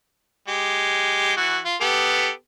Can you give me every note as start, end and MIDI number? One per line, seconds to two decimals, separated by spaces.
0.48 1.37 56
0.48 1.37 67
1.37 1.58 52
1.37 1.58 66
1.65 1.76 65
1.81 2.30 59
1.81 2.30 67
1.81 2.30 69